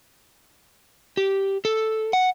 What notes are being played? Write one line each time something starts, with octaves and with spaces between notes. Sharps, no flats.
G4
A4
F#5